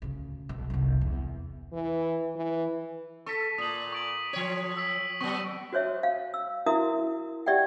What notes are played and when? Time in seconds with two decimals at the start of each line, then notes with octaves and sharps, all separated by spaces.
0.02 D2 C#3
0.49 B1
0.70 G1 C2
1.01 E2
1.73 E3
2.36 E3
3.26 A4 C#6 B6
3.58 A#2 D#6 F#7
3.92 C#6 D7 F#7
4.33 F3 C#5
4.77 E6 B6
5.21 F#3 B3 C#6
5.73 F#4 C5 C#5 E5
6.03 F5
6.34 E6
6.66 E4 F#4 A#4 E5 D#6
7.46 G4 D5 E5 F#5 G5